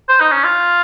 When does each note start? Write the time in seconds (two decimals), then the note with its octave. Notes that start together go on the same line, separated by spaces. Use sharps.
0.09 C5
0.21 D#4
0.32 C#4
0.44 F4